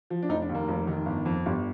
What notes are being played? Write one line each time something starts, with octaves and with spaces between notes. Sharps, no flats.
F3
D4
F1 D#4
D4
D#2
A#3
F1
D#3
G1
F2
G1 G3